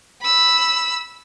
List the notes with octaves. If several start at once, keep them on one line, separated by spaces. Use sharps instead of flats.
B5 E6